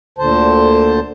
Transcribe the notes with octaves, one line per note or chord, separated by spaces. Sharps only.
D2 A#2 D3 C5 A5